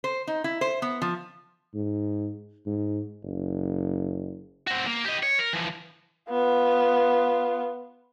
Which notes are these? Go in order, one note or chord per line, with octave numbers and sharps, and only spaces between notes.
C5
D#4
E4
C5
B3
F3
G#2
G#2
F#1
C4 F#4
A#3
G4 D#5
C#5
A#4
E3 F3
B3 F4